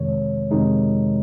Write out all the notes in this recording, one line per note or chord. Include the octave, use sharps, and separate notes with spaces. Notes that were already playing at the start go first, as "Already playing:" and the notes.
Already playing: F2 C3 D#3 G#3 C#5
F2 C3 D#3 G#3 D#4